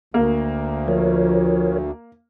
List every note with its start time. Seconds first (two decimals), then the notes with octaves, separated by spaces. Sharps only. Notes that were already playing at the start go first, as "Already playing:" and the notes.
0.14 D2 A#3
0.88 F3 A#4 C#5